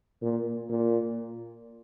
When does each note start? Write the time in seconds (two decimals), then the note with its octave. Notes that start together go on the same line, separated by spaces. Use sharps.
0.22 A#2
0.70 A#2